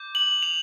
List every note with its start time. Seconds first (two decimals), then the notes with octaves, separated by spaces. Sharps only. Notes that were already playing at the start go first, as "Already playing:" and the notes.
Already playing: D6 G6
0.15 F#7
0.43 F7